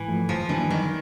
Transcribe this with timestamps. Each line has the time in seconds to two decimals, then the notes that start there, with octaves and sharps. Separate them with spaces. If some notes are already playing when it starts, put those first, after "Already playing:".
Already playing: G#2 E3
0.08 F3 A3
0.28 F#2 F3
0.49 D#3 E3 F#3 A#3 D4
0.70 D#3 G3